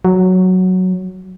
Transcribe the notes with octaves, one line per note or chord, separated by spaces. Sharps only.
F#3